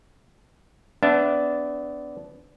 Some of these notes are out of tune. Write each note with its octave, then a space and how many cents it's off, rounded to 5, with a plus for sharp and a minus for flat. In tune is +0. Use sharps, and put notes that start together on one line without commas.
B3 +20 D4 -15 E5 +5